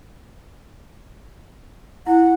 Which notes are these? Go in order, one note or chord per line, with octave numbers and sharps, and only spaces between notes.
E4 F#5